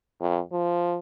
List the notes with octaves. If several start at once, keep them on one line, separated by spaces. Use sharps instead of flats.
F2
F3